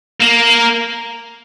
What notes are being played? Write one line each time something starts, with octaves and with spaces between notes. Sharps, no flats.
A#3